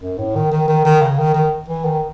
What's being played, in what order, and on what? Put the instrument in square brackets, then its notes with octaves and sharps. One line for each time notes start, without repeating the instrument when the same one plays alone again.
[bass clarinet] F#2
A2
D#3
D#3
D#3
D#3
C#3
D#3
D#3
E3
D#3